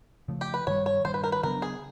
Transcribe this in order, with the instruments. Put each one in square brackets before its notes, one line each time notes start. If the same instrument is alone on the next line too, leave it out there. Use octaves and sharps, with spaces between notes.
[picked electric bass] C#3 F3 A3
[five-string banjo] G4
B4
[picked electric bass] G2 D#3 G3 [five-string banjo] C#5
[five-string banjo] C#5
[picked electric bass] G2 D#3 G3 [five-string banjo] C5
[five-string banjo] B4
A#4
B4
[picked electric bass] C#3 F#3 B3 D4 [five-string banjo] A#4
[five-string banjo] G#4